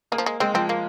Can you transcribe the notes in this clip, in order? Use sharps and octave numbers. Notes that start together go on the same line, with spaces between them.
G#3 A#3
F3
G#3
G#3 C4
F3 C4
A#3